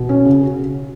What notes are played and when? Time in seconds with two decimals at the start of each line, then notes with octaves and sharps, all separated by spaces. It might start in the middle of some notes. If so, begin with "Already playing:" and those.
Already playing: B2
0.09 C#4
0.25 C#3
0.41 F#4